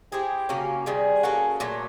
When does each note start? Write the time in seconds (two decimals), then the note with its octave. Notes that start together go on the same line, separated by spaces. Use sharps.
0.12 C4 E4 G4 G#4
0.49 C#3 F#3 A#3 C#4
0.86 C3 D#3 G3 G#4
1.23 A#3 C#4 F#4 A4
1.60 A#2 F#3 A3